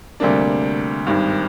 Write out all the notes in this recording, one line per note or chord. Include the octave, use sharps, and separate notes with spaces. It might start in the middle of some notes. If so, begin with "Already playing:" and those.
D2 C3 G3 A#3 D4
G#1 G2 D#3